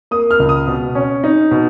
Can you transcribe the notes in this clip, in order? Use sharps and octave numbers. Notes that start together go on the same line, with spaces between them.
A#3 D#6
F6
C#2
D#6
B2
C#4
D#4
B2